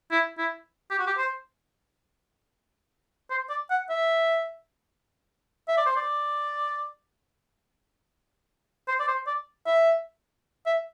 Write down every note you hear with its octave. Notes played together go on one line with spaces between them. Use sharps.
E4
E4
G4
F#4
G4
C5
C5
D5
F#5
E5
E5
D5
C5
D5
C5
D5
C5
D5
E5
E5